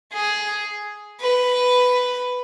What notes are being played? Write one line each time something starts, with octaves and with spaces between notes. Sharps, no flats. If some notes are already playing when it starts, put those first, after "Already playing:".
G#4
B4